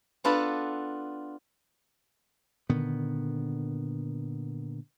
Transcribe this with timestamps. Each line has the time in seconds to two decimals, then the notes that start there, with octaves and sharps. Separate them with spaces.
0.24 B3 D4 F4 A4 B4
2.69 A#2 D3 D#3 B3